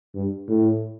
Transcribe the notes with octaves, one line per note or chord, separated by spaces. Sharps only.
G2
A2